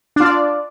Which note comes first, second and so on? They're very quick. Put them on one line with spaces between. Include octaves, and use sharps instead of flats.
D4 F4 D5